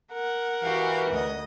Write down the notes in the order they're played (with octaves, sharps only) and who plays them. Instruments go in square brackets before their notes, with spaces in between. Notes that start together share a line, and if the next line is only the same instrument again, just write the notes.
[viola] A#4 F#5
[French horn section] E3 [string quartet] F#4 G4 F5
[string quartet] D2 D#5